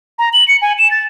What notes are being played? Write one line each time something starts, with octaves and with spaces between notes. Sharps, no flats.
A#5
F#7
C#7
G#5
E7
A6